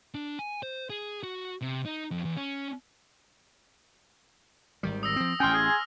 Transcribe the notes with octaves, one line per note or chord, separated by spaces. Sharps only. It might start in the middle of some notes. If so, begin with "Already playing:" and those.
D4
G#5
C5
G#4
F#4
C3
D#4
F2
E2
C#4
G#1 D#3 G3
D#6 E6 A#6
F3 C4
A1 C#4 G5 G#5 C6 D#6 F6
G#4